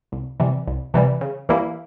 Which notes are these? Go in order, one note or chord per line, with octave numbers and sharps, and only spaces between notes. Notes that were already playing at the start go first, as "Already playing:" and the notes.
C2
C3 E3 G3
C2
C3 E3 G3
C#3
E3 G3 A#3 E4